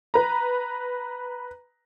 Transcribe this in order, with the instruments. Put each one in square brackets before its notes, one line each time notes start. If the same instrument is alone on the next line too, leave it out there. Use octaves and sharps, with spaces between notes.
[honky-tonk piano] B4 A#5